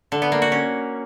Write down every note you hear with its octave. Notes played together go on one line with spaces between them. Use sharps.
D3
B3
A#3
F#4
C#4